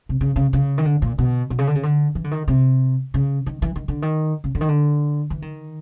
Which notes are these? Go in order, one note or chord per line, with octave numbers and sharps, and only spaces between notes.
C3
C#3
C#3
C#3
D#3
D3
A#2
B2
B2
C#3
D3
C#3
D3
E3
D3
D#3
C3
C#3
D#3
E3
D#3
D3
D#3
C#3
D3
D#3
D3
E3
D#3